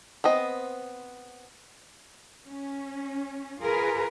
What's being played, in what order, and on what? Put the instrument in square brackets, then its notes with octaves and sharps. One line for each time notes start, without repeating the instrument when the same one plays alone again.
[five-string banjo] B3 C4 D#5
[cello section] C#4
F4 G#4 A#4 B4